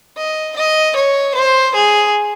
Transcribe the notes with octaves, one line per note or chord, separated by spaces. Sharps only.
D#5
D#5
C#5
C5
G#4